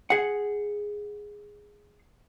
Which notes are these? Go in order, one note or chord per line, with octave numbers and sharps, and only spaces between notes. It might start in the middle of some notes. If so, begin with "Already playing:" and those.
G#4 F#5